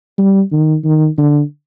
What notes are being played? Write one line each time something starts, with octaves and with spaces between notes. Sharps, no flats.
G3
D#3
D#3
D3